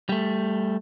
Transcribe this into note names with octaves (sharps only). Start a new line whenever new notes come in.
G3 A3